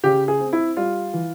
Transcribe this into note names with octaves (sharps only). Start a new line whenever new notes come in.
C#3 G4
G#4
C4
E4
G3 F4
E3